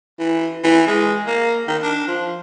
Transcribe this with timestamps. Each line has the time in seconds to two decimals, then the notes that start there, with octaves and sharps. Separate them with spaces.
0.19 E3
0.64 E3
0.87 G#3
1.26 A#3
1.67 D#3
1.82 D4
2.07 F3